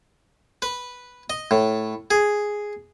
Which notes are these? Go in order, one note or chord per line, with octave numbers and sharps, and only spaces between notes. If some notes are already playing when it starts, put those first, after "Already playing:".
B4
D#5
A2
G#4